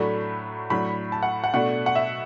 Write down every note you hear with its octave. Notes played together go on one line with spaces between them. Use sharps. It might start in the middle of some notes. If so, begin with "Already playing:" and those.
Already playing: A2 F#3 A3 D4 B5
A2 F#3 D4 B5
A5
F#5
F#5
B2 A3 D4 F#5
F#5
E5